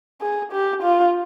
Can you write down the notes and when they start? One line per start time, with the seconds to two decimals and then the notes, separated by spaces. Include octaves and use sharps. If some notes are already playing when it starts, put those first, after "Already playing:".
0.21 G#4
0.52 G4
0.83 F4